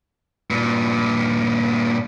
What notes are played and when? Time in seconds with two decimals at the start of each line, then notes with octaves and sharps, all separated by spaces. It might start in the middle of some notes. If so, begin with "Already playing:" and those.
0.50 G2 A#2